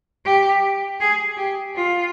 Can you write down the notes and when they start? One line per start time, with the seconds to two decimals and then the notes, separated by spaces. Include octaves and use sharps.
0.25 G4
1.00 G#4
1.37 G4
1.75 F4